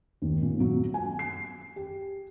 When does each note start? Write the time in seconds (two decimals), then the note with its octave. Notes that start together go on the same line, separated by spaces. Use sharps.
0.22 D#2
0.42 A#2
0.60 F#3
0.94 G#5
1.19 C7
1.76 G4